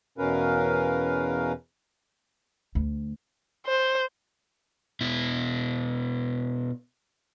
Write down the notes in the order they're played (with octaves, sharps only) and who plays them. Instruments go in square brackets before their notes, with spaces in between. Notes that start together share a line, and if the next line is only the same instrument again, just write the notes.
[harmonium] E2 B2 C#4 A#4 B4 F5
[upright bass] D2
[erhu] C5
[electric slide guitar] B2 E4